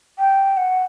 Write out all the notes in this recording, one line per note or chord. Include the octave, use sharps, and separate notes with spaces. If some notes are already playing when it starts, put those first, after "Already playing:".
G5
F#5